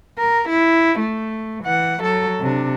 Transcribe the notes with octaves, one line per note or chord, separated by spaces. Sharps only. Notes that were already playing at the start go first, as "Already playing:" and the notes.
A#4
E4
A3
E3 F#5
F#3 A4
C3 D4